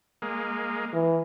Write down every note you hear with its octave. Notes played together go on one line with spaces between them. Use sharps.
G#3 A#3
E3